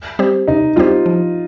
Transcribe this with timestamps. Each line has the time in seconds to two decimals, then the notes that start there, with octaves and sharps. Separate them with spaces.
0.19 G3 C4 G4 C5
0.47 C3 D#4
0.76 G3 C4 F4 G4 C5
1.06 F3